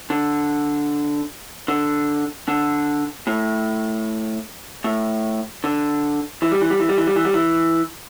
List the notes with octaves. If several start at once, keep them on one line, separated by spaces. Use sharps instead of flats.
D3
D3
D3
A2
A2
D3
E3
G3
E3
G3
E3
G3
E3
G3
E3
G3
E3